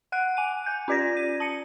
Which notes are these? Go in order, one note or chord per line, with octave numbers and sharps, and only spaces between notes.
F#5 F#6 D7
G#5 D#7
G#5 G6
C#4 F4 D5 G#6 A#6
D#7
A5 C#7